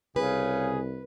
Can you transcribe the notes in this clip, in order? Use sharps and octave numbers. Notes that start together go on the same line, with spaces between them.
C2 C#3 G#4 B4